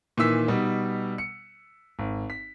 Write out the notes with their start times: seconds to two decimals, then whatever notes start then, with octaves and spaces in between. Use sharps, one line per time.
0.17 A#2 D#3 E3 E6 B6
0.48 B2 G3 D#4
1.18 C#7
1.99 G#1
2.30 B6